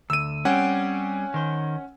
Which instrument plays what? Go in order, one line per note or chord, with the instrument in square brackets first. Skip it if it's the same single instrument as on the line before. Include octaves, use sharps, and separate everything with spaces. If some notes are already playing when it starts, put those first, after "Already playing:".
[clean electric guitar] D2 [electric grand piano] E6 D#7
[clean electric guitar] G3 C4 G4 [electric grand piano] C#4 F#5 G#5
[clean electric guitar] D#3 C5